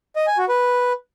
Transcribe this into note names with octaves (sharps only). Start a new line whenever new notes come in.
D#5
G#5
F#4
B4